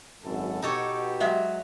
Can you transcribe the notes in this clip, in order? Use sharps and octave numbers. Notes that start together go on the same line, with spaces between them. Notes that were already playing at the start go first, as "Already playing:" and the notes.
G#1 F#2 A4
B2 D#4 G4 A4 C#5
F#3 G#3 E5